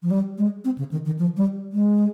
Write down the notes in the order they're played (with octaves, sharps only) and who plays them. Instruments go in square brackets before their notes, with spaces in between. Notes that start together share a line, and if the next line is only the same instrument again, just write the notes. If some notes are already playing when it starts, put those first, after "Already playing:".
[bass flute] F3
G3
G#3
C4
C#3
D#3
D#3
F3
G3
G#3